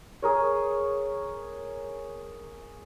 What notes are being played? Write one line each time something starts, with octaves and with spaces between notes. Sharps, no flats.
G#4 A#4 C#5